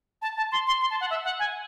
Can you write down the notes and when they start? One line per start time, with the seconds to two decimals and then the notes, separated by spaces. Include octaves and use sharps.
0.22 A5
0.37 A5
0.52 C6
0.67 C6
0.81 C6
0.91 A5
1.01 F#5
1.10 E5
1.24 F#5
1.39 G#5